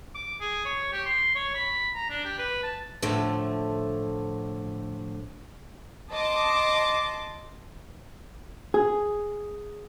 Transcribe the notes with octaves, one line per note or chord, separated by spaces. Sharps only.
D6
G#4
C#5
G4
C6
C#5
B5
A#5
D4
G4
B4
A5
A2 D3 F3 A3
D#5 A5 C6 D6
G#4